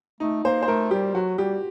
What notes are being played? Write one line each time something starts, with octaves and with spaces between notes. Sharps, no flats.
A3 D#4
A#3 C5
C5
A3 A#4
G3 G4
F#3 F#4
G3 G4